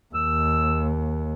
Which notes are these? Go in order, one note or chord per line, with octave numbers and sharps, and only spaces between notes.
D#2 E6